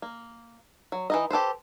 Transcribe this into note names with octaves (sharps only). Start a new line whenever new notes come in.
A#3
F#3
E3 D#4 D#5
G4 A4 B4 C5